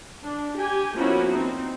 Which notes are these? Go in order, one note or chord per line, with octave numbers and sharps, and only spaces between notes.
D4
G4 G#5
F3 A#3 B3 C#4 E4 F#4
C4 D#4